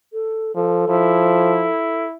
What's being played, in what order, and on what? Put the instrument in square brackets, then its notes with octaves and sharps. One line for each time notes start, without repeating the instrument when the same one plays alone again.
[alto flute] A4
[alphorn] F3 [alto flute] A4
[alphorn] F3 [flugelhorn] E4